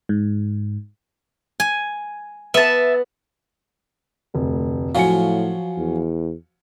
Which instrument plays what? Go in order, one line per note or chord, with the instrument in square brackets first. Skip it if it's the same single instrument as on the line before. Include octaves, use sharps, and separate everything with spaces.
[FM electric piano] G#2
[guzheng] G#5
[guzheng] B3 [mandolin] E5 A5
[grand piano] F1 D2
[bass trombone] A2 [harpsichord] F3 F#3 [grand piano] F5 G#5 C#7
[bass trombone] E2